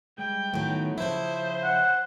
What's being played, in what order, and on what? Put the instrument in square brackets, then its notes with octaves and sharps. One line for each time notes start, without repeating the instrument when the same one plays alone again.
[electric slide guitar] G3 G#3 [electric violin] G5
[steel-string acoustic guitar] A2 F#3 [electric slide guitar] D#3 B3 D#4
[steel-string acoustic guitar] C#3 E4 [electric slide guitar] F3 A5 [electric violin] C5
[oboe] F#5